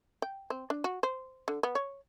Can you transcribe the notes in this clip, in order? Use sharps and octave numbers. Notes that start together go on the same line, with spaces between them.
G5
C4
D4
F#4
C5
D3
B3
C#5